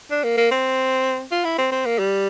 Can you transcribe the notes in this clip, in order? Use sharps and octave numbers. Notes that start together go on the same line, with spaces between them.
D4
A#3
A#3
C4
F4
E4
C4
C4
A#3
G3